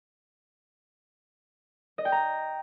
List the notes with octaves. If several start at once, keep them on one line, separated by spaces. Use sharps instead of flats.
D#5
G5
A#5